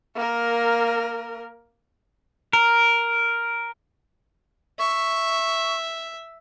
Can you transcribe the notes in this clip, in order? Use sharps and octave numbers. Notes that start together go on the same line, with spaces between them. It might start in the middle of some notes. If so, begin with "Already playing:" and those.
A#3 A#4
A#4
E5 C#6